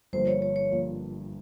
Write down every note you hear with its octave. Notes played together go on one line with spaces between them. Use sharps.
G1 G2 F3 A#3 C5
C#5
C#5
C#5
F3 A#3